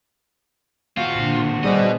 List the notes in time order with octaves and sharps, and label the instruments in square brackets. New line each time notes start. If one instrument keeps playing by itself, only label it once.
[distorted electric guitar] C4 F#4 [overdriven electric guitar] F4
[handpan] A#2 D3
[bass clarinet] G3 [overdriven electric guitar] B3 D#5 [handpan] G#4 C5